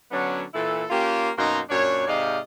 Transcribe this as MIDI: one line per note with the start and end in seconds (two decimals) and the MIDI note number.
0.11 0.44 50
0.11 0.44 54
0.11 0.44 59
0.11 0.44 61
0.11 0.44 62
0.54 0.85 46
0.54 0.85 52
0.54 0.85 64
0.54 0.85 69
0.90 1.30 58
0.90 1.30 61
0.90 1.30 65
0.90 1.30 67
1.38 1.60 42
1.38 1.60 47
1.38 1.60 58
1.38 1.60 63
1.38 1.60 82
1.38 1.60 84
1.70 2.07 42
1.70 2.07 46
1.70 2.07 62
1.70 2.07 73
2.07 2.39 44
2.07 2.39 48
2.07 2.39 74
2.07 2.39 75
2.07 2.39 77